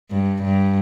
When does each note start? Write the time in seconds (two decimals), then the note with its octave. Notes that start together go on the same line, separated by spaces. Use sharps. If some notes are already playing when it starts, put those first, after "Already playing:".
0.10 G2
0.42 G2